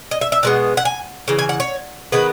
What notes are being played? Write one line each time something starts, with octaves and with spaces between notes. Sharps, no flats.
D#5
E5
E5
B2 G#3 B3 F#5
F#5
G#5
C#3 E3
G#5
F#5
C#5
D#3 G#3 B3 B4